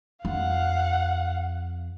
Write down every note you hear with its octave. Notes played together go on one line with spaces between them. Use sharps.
F2 F5 F#5